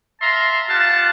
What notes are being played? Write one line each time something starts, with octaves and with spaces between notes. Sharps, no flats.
E5 F5 A5 A#5 C6
F4 G4 F5 F#5 A5